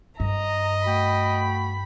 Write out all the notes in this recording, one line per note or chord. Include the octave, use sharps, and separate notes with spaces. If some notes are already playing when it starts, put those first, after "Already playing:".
G2 D#5 A#5
A3 F#4 G5 B5